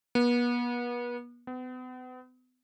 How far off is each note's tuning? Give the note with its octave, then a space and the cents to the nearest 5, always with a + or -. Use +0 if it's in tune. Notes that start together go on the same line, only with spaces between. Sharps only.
B3 -35
B3 +40